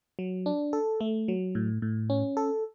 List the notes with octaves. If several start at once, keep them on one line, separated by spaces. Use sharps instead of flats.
F#3
D4
A4
A3
F#3
A2
A2
C#4
A4